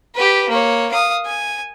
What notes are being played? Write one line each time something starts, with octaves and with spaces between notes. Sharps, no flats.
G4 B4
A#3 C#5
F5 D#6
G#5